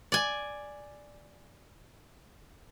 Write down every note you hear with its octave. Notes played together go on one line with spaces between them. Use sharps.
D5 G#5